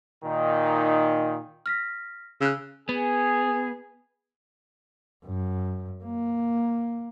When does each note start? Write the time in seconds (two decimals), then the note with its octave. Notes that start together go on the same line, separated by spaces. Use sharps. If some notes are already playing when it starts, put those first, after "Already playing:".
0.23 A#2 D#3 D#4
1.66 F6 A#6 B6
2.41 C#3 E6 F#6
2.89 B3 G#4
5.26 F#2
6.04 A#3